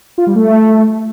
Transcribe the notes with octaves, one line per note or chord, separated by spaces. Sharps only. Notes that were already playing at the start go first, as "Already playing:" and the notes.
F4
G3
A3